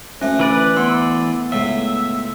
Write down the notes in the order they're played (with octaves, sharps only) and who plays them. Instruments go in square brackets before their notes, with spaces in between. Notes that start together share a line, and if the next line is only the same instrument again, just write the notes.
[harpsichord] D2 A3 [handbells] C#4
[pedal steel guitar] E3 B4 D5
[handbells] B3 C6 E6
[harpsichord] C#2 A2 [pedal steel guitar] E5